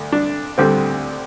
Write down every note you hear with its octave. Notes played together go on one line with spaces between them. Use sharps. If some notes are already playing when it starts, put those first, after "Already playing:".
Already playing: D2
D4
D2 D3 G3 C4